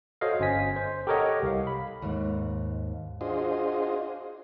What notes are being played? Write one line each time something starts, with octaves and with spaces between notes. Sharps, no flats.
F#4 A4 C5 C#5 D#5 F5
G1 C#4 C5 D#5 G#5 B6
C5
G4 A4 A#4 C#5 D#5 F#5
C2 F5
B5
D#2 G#2
D4 F4 F#4 G#4 C5 D#5